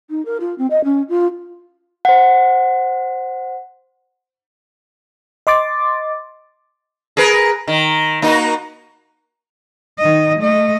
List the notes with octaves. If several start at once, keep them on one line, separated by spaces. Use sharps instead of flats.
D#4
A#4
F4
C4
D#5
C#4
F4
C5 F#5
D#5 C6 D6 A6
G#4 A#4 B4
D#3
A#3 D#4 F#4
D#3 D#5
A3 D#5